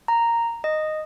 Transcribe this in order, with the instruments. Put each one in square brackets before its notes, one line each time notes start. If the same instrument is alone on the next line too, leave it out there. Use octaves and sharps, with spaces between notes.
[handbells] A#5
D#5